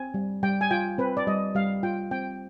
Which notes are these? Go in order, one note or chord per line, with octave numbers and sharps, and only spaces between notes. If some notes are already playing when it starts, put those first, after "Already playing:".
Already playing: C4 G#5
G3
G3 G5
G#5
F4 G5
C4 B4
D5
G3 D#5
G3 F5
F4 G5
C4 G5